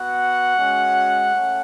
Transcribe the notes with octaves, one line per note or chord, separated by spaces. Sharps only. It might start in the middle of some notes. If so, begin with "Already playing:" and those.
Already playing: B3 F#4 F#5
G#3 C#4 F#4
A3 C#4